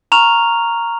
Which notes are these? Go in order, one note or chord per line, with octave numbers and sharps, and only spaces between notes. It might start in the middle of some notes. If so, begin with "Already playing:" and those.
A#5 C#6 F6 F7